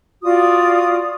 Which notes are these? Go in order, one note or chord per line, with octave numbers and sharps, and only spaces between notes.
F4 F#4 D5 D#6